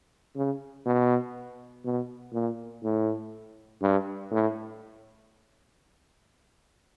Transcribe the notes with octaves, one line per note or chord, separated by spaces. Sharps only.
C#3
B2
B2
A#2
A2
G2
A2